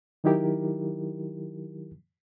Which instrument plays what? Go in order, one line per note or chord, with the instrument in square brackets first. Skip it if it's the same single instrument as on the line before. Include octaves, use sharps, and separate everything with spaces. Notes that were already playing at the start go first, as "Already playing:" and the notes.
[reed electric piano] D#3 F#3 D#4 E4 G4 A#4